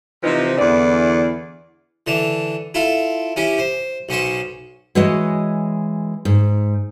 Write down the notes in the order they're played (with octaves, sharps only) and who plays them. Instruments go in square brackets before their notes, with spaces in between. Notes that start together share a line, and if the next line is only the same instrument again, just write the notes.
[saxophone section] C3 E3 F3 D#4
E2 D3 E3 D5
[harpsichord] D3 E3 A5
E4 F4 A4
C#4 E4 G4
C5
B1 C#4 C5 C#6
[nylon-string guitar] E3 G#3 F#4 C#5 D#5
G#2